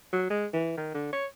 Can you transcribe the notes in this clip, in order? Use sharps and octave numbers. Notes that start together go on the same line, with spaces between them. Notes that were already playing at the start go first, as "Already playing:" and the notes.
F#3
G#3
E3
D#3
D3
C#5